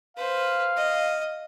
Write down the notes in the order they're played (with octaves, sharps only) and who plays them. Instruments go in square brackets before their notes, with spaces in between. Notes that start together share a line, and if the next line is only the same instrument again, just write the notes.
[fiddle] B4 C5 [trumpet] F5
[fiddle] D#5